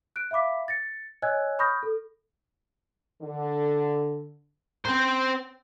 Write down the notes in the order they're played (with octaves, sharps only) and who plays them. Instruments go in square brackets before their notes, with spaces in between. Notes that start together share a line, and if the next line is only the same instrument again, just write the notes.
[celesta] F#6 D7
E5 F5 B5 D6 B6
A6 A#6 C#7
C#5 D#5 G#5 E6 F#6 G#6
B5 C#6 D#6 F6 G6 A#6
A4
[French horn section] D3
[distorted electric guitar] C4 C5